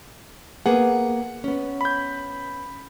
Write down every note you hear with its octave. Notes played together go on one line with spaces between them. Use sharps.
A#3 B3 G#4 F#5
B3 C#4
B5 G6